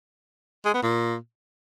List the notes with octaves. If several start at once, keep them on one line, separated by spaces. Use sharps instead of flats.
G#3
B3
A#2